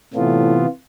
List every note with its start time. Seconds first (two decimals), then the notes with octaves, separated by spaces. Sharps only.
0.14 A2 C3 E3 B3 F4